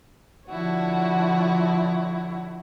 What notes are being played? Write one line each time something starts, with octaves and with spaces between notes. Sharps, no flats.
D3 F3 E4 F#4 C#5